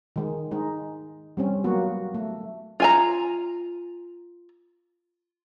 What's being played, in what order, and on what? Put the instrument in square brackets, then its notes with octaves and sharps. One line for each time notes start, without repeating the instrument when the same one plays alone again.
[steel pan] D#3 G#3
G#3 D#4
G3 C4 C#4
F#3 A#3 B3 F#4
A3
[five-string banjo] F4 G#5 A#5